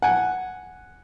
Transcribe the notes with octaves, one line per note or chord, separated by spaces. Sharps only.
F#5 G#5